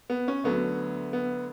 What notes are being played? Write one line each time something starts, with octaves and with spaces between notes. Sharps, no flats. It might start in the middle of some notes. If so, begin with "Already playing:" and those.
B3
C#4
D2 D3 F#3 B3
B3